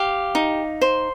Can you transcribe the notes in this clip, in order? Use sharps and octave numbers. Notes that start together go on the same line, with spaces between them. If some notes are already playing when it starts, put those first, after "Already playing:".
Already playing: G4 F5
D#4
C5